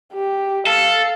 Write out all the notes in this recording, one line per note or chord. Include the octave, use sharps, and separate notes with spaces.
G4
A4 F5